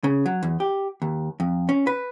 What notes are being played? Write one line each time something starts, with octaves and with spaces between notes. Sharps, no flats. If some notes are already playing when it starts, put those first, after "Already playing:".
C#3
F#3
E2
G4
D#2
F2
C#4
B4